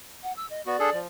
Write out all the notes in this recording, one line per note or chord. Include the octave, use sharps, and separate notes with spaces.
F#5
E6
D#5
B3 F#4 D5
D4 G#4 A4
F3